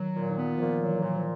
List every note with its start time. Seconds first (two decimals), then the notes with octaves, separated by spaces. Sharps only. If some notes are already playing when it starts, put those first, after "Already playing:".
Already playing: D#3 F#3
0.16 A#2
0.30 D#3
0.38 B3
0.58 A#2 F3
0.80 F#3
0.87 E3
1.01 A#2
1.16 F3